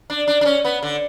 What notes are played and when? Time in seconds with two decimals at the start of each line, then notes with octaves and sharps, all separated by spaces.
0.10 D4
0.28 D4
0.41 D4
0.45 C#4
0.65 B3
0.83 D3